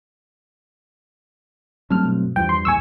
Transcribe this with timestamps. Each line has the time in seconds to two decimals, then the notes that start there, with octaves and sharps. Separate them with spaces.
1.90 G2 F#3 A3 C4 A5 F6
2.05 B2
2.36 E2 G2 E3 F3 F4 G5
2.49 C6
2.65 A#1 D#2 G#2 G#5 C#6 E6